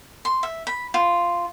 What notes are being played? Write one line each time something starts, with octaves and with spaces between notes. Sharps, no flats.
C6
E5
B5
F4